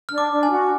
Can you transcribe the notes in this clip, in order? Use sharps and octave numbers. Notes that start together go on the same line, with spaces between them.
D4 F6
D6
D4
G#5
F#4